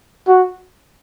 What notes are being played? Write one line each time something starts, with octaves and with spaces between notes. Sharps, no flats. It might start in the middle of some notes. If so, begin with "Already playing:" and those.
F#4